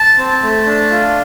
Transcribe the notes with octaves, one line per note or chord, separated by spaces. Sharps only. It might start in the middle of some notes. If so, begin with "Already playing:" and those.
Already playing: A5
C4
A3
D4
F4